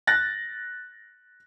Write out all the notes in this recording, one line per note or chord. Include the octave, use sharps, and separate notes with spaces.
F#6 A6 A#6